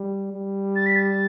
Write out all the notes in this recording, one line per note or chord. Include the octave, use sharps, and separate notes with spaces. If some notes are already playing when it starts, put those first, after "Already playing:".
Already playing: G3
G3
A6
B6
A6